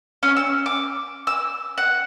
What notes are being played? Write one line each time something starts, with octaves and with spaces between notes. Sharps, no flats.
C#4
E6
D6
E6
F#5